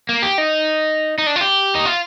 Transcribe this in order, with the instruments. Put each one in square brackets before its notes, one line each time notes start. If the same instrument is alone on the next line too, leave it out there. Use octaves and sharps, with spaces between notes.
[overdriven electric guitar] A#3
G4
D#4
D#4
D4
F4
G4
D#4
F4